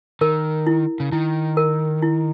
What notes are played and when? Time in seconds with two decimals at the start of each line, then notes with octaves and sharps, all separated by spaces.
0.21 D#3 A#4
0.67 E4
1.00 C#3
1.12 D#3 E4
1.57 A#4
2.02 E4